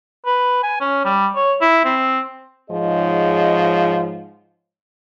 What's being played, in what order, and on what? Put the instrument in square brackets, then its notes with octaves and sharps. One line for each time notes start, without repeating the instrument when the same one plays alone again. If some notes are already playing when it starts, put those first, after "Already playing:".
[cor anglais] B4
G#5
C#4
G3
C#5
E4
C4
[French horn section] G#2 F3 D#4 G#4 C#5 D#5